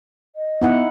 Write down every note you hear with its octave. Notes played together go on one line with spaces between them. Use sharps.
D#5
B3 D#4 E4 F#5